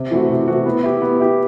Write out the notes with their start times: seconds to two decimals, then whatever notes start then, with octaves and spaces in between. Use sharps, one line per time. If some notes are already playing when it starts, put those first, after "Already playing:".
Already playing: C3
0.11 E3 A3 C4 F#4
0.29 C3
0.48 E3 A3 C4 F#4
0.66 B3
0.83 E4 G4
1.02 B3
1.20 E4 G4